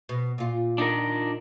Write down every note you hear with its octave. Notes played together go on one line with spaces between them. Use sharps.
B2
A#2 F4
D4 D#4 A#4